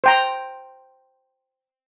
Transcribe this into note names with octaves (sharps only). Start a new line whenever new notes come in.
C5 G5 A#5